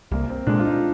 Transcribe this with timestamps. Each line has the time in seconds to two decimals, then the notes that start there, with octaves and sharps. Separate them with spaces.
0.12 C2 A#3
0.30 C4
0.47 A#2 G#3 D4
0.59 F4
0.65 D#4